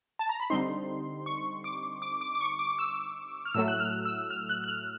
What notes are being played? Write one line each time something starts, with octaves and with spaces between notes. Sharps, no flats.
A5
A#5
B5
D3 G3 C4 D#4 C6
C#6
D6
D6
D6
D6
C#6
D6
E6
F6
A2 F#3 A3 E6
F#6
F6
E6
F6
F#6
F#6
F6